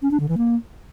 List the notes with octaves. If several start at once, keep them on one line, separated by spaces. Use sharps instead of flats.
C#4
D4
D3
E3
A#3